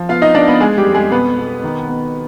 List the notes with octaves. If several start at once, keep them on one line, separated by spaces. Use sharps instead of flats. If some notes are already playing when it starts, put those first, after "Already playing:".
Already playing: F3
B3 F4 F5
D#4 D#5
B3 D4 D5
B3 B4
G#3 G#4
G3 G4
F2
G#3 G#4
B2 B3 B4
B2
D#3
B3